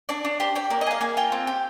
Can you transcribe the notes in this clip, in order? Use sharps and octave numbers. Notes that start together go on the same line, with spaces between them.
D4 D5
D4
G4 C5
G4 D5
A#3 D5
D#5
G#4 F5
A#3 G#5
F4 G5
C4
G4